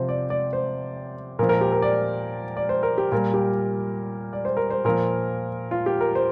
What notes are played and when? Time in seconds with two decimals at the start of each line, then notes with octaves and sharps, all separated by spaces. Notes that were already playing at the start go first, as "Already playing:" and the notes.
Already playing: C3 F3 C5
0.09 D5
0.30 D5
0.53 C5
1.39 A#2 F3 A#4
1.49 A#4
1.61 G4
1.72 A#4
1.82 D5
2.57 D5
2.69 C5
2.83 A#4
2.98 G4
3.12 A#2 G3 A#4
3.34 G4
4.33 D5
4.45 C5
4.57 A#4
4.70 C5
4.85 A#2 F3 A#4
5.71 F4
5.86 G4
6.01 A#4
6.15 C5